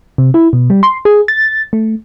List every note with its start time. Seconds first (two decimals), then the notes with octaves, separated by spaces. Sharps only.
0.18 C3
0.34 E4
0.53 B2
0.70 G3
0.83 C6
1.05 G#4
1.28 A6
1.73 A3